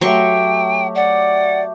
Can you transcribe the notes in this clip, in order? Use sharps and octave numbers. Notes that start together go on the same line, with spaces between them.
F#3 A3 G4 C#5 G5 C6 C#6
D5 F#5